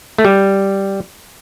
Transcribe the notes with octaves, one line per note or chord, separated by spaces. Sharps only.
A3
G3